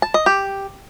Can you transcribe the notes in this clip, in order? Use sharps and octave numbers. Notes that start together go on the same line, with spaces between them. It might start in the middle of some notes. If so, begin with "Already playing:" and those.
A5
D#5
G4